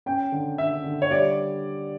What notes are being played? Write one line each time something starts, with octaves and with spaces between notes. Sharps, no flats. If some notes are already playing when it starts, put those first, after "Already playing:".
C#4 G5
D3
D3 E5
D3
C#5
G3 D5